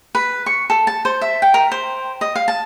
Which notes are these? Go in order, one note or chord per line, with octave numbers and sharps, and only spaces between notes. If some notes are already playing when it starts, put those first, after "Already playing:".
B4
C#6
A4
A5
C5
E5
G5
A#4
C5
D#5
F5
A5